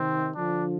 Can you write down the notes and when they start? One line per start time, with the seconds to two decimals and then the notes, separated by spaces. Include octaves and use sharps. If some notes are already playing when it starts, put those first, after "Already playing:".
Already playing: C3 D#3 C4
0.36 D3 F3 D4